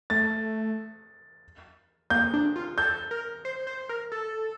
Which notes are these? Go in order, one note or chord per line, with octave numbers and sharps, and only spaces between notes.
A3 A6
A#3 G6
D4
F4
A4 G6
A#4
C5
C5
A#4
A4